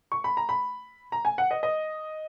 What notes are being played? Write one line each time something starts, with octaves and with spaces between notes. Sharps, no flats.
C#6
B5
A#5
B5
A#5
G#5
F#5
D#5
D#5